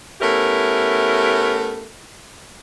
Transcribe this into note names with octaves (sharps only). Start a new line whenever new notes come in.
A3 B3 C#4 E4 G4 A#4